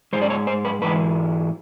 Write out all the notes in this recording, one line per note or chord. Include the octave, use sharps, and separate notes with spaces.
G#2 E3 G#3 C5
D5
C#5
C5
B4
G#2 E3 G#3 B4